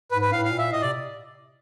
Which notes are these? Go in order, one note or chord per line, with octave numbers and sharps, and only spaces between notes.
G#2 B4
B4
A2 F5
F5
A#2
E5
A2 D#5
C3 D5